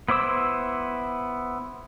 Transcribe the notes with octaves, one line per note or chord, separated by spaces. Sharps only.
B3 E4 C5 D6 E6